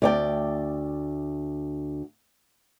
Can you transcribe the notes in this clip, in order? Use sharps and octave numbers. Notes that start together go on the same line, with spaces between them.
D2 D5 G5